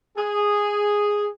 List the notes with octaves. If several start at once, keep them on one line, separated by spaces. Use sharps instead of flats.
G#4